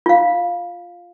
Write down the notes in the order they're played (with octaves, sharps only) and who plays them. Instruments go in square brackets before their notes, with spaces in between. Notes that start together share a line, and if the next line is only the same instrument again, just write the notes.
[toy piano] F4 F5